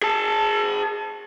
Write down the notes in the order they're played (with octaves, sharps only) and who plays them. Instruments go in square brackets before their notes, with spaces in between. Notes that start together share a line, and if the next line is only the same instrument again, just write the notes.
[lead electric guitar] G#4 A5